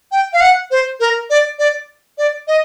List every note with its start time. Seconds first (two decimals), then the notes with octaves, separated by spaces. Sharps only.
0.12 G5
0.33 F5
0.41 F#5
0.71 C5
1.00 A#4
1.30 D5
1.59 D5
2.18 D5
2.48 D#5